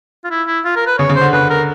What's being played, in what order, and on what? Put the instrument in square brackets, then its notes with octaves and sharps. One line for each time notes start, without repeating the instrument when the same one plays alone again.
[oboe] F4
E4
E4
F4
A#4
B4
[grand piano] C#3 [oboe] C#5
[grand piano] C#3
[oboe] C5
[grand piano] D3
[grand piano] C#3 [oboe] B4
[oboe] A#4